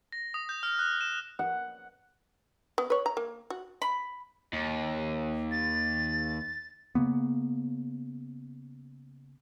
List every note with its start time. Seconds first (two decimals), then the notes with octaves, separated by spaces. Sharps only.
0.12 A#6
0.34 D#6
0.49 G6
0.63 F6
0.79 F#6
1.01 E7
1.39 F#5
2.78 B3
2.90 B4 C#5
3.06 A#5
3.17 A#3
3.50 F#4
3.82 B5
4.53 D#2
5.51 A6
6.95 C#3 A#3 B3